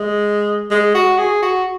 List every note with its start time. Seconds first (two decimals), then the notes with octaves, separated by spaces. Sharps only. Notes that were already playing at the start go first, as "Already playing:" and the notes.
Already playing: G#3
0.71 G#3
0.95 F#4
1.18 G#4
1.42 F#4